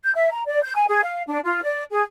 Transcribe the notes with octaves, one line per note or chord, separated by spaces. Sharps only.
G6
E5
A#5
D5
G6
G#5
G#4
F5
D4
F4
D5
G#4